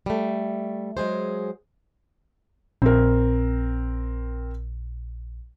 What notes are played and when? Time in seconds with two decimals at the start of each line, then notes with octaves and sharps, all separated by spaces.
0.06 G3 A3
0.97 F#3 G#3 G#4 C5
2.82 A#1 C4 A#4